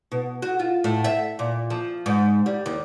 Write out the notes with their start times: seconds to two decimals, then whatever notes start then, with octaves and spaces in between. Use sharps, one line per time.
0.12 B2
0.42 F#4
0.59 F4
0.84 A2
1.04 E5
1.39 A#2
1.70 F3
2.06 G#2
2.46 G3
2.66 D#2